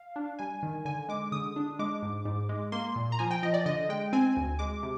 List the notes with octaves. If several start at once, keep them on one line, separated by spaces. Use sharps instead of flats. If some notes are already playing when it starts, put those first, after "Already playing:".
Already playing: F5
D4
G3 G#5
D#3
D3 G#5
G#3 D6
D3 D#6
D4
G#3 D6
G#2
G#2
G#3
A#3 C6
A#2
A#5
F3 G#5
G5
F3 D#5
D5
D3 D#5
G#3 G5
C4 G#5
D2
G#3 D6
C3